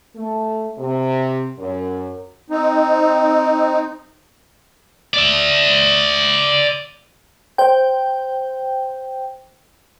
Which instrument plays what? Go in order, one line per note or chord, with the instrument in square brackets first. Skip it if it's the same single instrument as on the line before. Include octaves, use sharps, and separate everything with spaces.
[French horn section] A3
C3
F#2
[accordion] C4 D#4
[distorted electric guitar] D5 E5
[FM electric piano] C5 G5